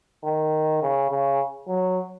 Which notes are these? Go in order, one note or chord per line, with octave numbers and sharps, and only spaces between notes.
D#3
C#3
C#3
F#3